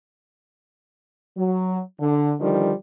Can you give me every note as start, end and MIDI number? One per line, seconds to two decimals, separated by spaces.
1.37 1.81 54
2.00 2.33 50
2.40 2.72 50
2.40 2.72 51
2.40 2.72 53
2.40 2.72 55